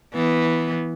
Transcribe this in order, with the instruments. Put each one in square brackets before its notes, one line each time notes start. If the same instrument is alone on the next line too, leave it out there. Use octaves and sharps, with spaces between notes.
[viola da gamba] E3 B3